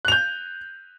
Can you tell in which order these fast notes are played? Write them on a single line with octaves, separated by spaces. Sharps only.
F#6 F7 G6